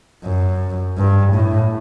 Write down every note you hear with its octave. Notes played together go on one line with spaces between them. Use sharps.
F#2
G2
A2